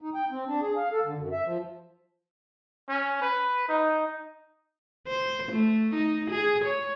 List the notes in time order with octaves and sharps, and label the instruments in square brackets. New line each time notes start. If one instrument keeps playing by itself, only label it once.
[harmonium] D#4
G5
C4
D4
G#4
F5
A4
D3
F#2
E5
F3
[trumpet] C#4
B4
D#4
[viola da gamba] C5
A3
D#4
G#4
C#5